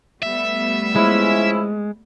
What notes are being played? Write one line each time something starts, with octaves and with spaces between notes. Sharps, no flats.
G3 A3 B3 E5
F3 G#3 C#4 E4